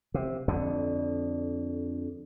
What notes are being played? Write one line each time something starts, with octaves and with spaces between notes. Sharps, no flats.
C3
F2 D3